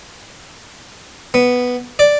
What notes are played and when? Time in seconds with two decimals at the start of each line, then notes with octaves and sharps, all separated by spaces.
1.34 B3
1.99 D5